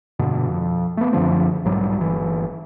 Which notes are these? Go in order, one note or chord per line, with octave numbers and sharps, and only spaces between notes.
F1 G2 B2 D3
F2
A3 B3
F#2 D3 F3 C4
B1 G#2 F#3 G3
G1 E3